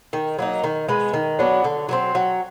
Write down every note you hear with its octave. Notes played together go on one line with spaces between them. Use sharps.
D#3
F#3 A#3 D#4
D#3
G#3 B3
D#3
F#3 B3 D4
D3
F#3 A3 C4
F#3